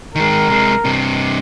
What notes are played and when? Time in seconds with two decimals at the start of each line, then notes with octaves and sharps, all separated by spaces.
0.15 D#3 G#3 A#4
0.50 C3 G#3
0.85 G2 C3